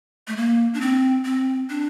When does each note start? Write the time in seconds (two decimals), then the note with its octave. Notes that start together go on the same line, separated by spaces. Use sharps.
0.28 A3
0.37 A#3
0.74 D4
0.81 C4
1.25 C4
1.70 D4